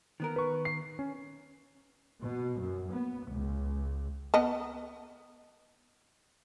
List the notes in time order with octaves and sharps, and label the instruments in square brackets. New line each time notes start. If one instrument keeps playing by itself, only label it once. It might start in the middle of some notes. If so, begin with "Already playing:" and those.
[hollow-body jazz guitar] D#3 B3 A#4
[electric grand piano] B4 C#6
C7
C#4
[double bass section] B2
F#2
B3
C#2
[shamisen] B3 D#5 A5